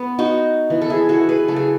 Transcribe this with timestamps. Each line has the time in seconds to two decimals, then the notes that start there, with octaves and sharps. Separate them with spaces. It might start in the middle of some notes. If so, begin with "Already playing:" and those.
Already playing: B3
0.19 D#4 F#4
0.70 E3 B3
0.82 A4
0.90 E4 G#4
1.09 F#4 A4
1.29 G#4 B4
1.48 C#3 F#3 A3 A4
1.56 G#4